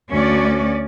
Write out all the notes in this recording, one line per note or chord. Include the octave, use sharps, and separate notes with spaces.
D2 C#4 F#4 D5